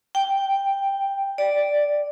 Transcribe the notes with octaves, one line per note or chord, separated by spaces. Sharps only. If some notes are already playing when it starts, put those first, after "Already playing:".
G5
D5